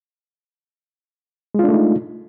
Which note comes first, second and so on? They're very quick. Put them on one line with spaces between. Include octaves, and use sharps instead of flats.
G#3 F4 D4 A3 D#4